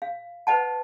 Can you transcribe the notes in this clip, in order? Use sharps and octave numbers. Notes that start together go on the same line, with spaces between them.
F5
B4 C5 D#5 F#5 A5